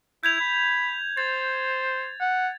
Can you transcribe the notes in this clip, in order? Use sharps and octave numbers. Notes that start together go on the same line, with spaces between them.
E4 G6 G#6 F7
B5
C5 A6
F#5